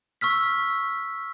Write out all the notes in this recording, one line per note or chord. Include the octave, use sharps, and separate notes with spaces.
C#6 E6 F6 B6